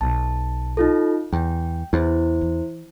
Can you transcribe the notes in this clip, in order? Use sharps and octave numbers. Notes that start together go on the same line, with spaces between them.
B1 A5
D#4 F4 A4
E2 G3 G5
E2 E4 C5
E3